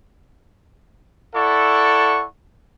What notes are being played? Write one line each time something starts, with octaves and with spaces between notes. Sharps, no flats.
E4 A4 D5 F#5 C#6